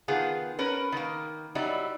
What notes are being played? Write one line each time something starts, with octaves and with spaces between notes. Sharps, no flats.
D#3 B3 F4 G#4
C#4 A#4 B4
D#3 A#3
F#3 G3 D#4 E4